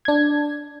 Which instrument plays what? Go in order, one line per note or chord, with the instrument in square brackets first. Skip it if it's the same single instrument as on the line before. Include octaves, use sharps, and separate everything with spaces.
[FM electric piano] D4 G#6